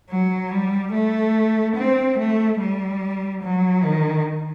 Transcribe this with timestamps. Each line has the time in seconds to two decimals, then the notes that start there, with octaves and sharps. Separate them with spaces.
0.10 F#3
0.51 G3
0.93 A3
1.76 C4
2.18 A3
2.59 G3
3.43 F#3
3.84 D#3